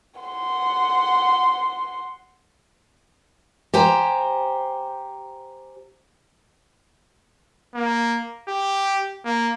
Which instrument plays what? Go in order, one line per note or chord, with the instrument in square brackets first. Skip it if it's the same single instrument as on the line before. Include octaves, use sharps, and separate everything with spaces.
[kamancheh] F#5 C6
[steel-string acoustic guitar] G4 C5 G5 G#5 A#5
[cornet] A#3
G4
A#3